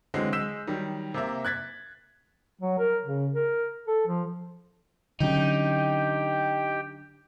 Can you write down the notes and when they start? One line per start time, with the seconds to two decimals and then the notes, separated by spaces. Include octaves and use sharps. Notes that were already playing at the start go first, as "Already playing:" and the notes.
0.14 D3 E3 F#3 G#3 C4
0.32 G#3 E6 G6 B6 E7
0.67 D#3 F#3 G3
1.14 C3 A#3 E5
1.45 F#6 G#6 A6 B6
2.61 F#3
2.79 A#4
3.05 C#3
3.33 A#4
3.88 A4
4.07 F3
5.20 D3 F#3 C#4 D#4 G4 G5